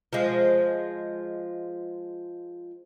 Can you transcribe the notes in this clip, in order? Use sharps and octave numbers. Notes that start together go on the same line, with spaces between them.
F3 G#3